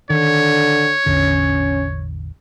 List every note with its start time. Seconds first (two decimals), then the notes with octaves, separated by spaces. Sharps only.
0.10 D3 D#3 C#5
1.06 A1 E2 D3 C#4